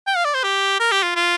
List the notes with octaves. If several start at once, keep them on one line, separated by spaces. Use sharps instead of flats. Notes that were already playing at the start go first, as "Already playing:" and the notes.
G5
F5
D5
C5
G4
A#4
G4
F4
F4